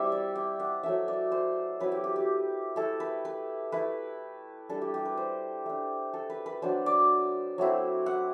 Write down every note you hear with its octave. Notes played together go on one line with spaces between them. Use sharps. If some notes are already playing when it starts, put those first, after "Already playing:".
Already playing: G3 C4 E4 E5
D5
G5
F#5
F#3 A3 E4 E5
D5
C5
F#3 C4 E4 B4
G4
G4
G4
A3 E4 A4
B4
B4
A3 E4 B4
G3 D4 A4
G4
G4
B4
C5
A3 D4
A4
B4
B4
F#3 B3 D4 C5
D5
F#3 A3 C4 E4
F#5